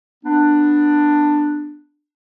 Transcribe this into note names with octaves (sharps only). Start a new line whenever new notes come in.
B3 D4